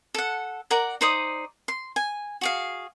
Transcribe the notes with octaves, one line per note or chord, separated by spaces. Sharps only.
A4 F#5
A#4 D5 F#5 A#5
D#4 C5 D5 D#6
C6
G#5
F#4 G#4 F5